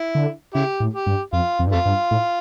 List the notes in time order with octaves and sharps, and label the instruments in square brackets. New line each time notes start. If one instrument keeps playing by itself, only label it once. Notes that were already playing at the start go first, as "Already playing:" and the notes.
Already playing: [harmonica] E4
[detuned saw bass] D3
[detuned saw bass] C#3 [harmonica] E4 G4
[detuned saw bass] A2
[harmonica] G4
[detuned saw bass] G2
[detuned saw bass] F2 [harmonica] F4
[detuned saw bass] F2
G2
[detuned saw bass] F2 [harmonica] A3 F4
[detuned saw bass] G2
A2